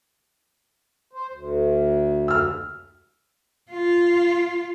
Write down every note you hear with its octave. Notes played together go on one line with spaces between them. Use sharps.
C5
D2
E6 F6
F4